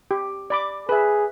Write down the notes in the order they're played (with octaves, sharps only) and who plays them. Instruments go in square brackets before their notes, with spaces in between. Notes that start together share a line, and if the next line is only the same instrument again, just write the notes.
[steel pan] G4
D5 B5 D6
[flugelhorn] G#4 [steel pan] B4 E5